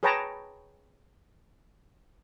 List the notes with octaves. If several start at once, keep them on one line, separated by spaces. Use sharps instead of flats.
G#4 B4 C#5 G5 A5 A#5